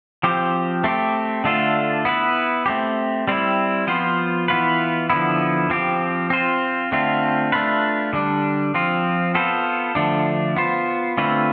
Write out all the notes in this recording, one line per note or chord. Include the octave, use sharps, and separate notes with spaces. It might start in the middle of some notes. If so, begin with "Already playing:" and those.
F3 C4 G4 C5
A3 C4 G4
D3 A3 D4 F4 A4
B3 E4 B4
A3 C4 G4
G3 C4 E4
F3 B3 F4 C5
E3 B3 F4 B4
D3 F3 B3 E4
F3 C4 G4
C4 F4 C5
D3 A3 C4 F4
A3 D4 F4 B4
D3 G3 D4
F3 C4 F4
B3 F4 A4 C5
D3 F3 A3 D4
B3 F4 C5
D3 A3 C4 F4 B4